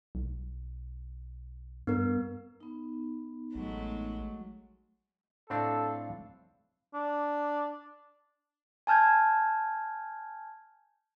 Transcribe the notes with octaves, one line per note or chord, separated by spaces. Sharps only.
B1
G2 B3 A#4
B3 D#4
A1 F#3 G#3 A3
A2 C4 D4 A4 F5
D4
G#5 A5 F6 G6 G#6